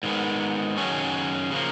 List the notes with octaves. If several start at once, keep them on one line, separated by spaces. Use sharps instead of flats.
G#2 D#3 G#3 B3
F#2 D#3 F#3 C#4 G#4
C#3 F3 A#3